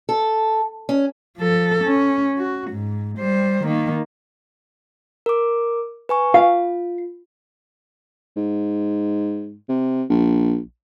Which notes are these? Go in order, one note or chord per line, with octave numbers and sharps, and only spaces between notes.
A4
C#4
F3 A4
C#4
F#4
G#2
G3 C5
D#3 A#3
A#4 D6
B4 G#5 C#6
F4 F5
G#2
C3
A#1